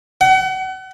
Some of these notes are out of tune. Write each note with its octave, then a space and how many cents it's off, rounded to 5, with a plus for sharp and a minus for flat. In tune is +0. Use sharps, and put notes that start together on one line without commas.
F#5 +35